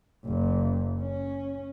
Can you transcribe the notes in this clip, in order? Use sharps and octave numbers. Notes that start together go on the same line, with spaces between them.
F#1
C#4